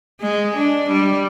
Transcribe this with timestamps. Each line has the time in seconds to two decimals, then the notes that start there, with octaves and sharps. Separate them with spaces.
0.21 G#3
0.57 D4
0.91 G3